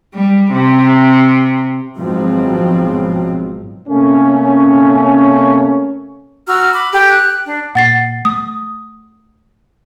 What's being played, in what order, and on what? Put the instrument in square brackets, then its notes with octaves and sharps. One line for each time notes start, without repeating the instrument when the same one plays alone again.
[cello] G3
C3
[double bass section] G#1 G#2 B2 F3 F#3 C4
[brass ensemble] C3 A3 A#3 C#4
[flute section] F#4 A#5 E6 F6
B5 D6
G4 A4
F#6
D4
[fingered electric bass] A#2 [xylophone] F#5 A6 C7
[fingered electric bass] A3 [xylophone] D#6